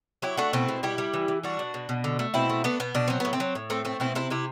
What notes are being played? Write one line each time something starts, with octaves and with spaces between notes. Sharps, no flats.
F#3 E4 G4
A3 D4 F#4
B2 C4 E4
B2
G3 E4 G4
G3
E3
E3
G3 D4 F#4
B2
B2
B2
D3
A3
B2 C4 E4
A3
A3 B3 D4
B2 B3
B2 D4
F#3 C4
A2 B3
C4
F#3
A2
A3 C4
A3 C4
B2 C4 E4
C3 C4 E4
C3 E4 G4